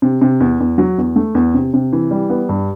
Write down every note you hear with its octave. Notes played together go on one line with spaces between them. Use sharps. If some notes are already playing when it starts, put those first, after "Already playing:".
C3
C3
E2
E2
F#3
E2
A3
E2
C3
C3
E3
G3
B3
G2